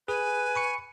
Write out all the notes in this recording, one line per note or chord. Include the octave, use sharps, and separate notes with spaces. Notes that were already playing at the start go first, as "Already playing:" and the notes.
G#4 B4 G#5
B5 C#6 C#7